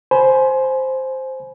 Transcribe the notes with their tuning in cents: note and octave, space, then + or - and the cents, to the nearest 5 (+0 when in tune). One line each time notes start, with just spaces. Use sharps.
C5 +0 G#5 +25 B5 +0